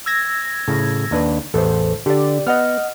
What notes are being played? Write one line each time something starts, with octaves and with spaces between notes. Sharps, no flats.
E6 G#6 A#6
A2 C#3
D#2 D4 B4
A1 E2 B3 A4 C5
D3 G4 D5
B3 D#5 F#5 F6